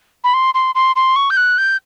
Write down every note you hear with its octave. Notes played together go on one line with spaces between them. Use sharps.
B5
C6
C6
C6
C6
C#6
G6
F#6
G6